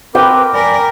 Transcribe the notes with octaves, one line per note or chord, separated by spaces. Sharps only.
C4 A#4 B4 G5 D6
A#4 D5 G#5 B5